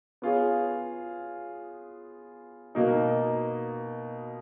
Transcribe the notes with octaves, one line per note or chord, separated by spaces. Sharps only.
B3 F4 G#4 C#5
B2 A#3 D#4